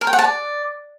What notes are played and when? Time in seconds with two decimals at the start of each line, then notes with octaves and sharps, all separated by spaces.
0.01 A#4
0.07 G5
0.13 F#5
0.19 A5
0.24 D5